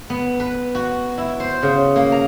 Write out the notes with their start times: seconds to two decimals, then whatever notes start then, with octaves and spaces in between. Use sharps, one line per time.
0.10 B3
0.40 B4
0.75 F#4
1.18 E4
1.40 C5
1.63 C#3
1.96 A#3
2.12 A#5